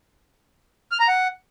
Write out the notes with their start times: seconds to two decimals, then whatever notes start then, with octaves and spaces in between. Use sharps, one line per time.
0.92 F6
1.00 A#5
1.08 F#5